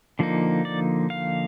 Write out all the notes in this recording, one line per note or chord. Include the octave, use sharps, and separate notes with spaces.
D3 F3 A#3 D#4
D5
F5